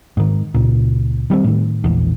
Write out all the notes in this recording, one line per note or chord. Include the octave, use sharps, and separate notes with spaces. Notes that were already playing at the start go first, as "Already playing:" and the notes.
G#2 D#3
C#2 A#2
D#3 G3 G#3 C4
A2 D#3
E1 A#1 E2